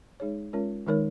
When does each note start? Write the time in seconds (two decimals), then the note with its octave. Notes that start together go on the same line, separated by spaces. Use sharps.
0.20 G#3 D#4 G#4 C#5
0.53 G#3 C#4 F4 A#4 C#5
0.87 D#3 G#3 D#4 A#4 C#5